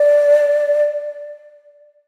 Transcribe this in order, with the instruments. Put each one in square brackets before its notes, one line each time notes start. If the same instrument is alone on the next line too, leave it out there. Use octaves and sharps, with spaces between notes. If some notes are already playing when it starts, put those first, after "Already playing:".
Already playing: [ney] D5